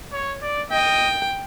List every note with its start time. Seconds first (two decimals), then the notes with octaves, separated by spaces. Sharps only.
0.13 C#5
0.42 D5
0.71 D#5 G5